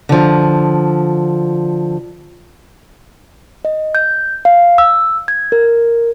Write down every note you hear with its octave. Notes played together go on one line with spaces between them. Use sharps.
D3 F3
D#5
G6
F5
E6
G#6
A#4